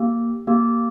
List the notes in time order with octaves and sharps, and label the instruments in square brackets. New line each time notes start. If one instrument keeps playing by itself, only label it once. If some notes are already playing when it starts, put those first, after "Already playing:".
Already playing: [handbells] A#3 G4
A#3 G4